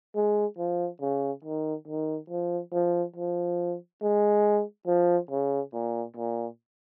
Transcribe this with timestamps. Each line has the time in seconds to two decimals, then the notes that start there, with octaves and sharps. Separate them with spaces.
0.15 G#3
0.58 F3
1.01 C#3
1.44 D#3
1.88 D#3
2.30 F3
2.73 F3
3.16 F3
4.02 G#3
4.87 F3
5.31 C#3
5.73 A#2
6.16 A#2